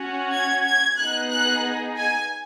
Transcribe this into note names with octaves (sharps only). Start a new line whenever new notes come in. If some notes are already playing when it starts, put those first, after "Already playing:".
Already playing: C#4 F#4
G#6
G#6
B3 D#4 G#4 F#6
F#6
G#5